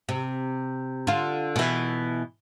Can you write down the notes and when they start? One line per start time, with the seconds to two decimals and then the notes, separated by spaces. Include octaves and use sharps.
0.09 C3
1.07 D3 F4
1.56 B2 E3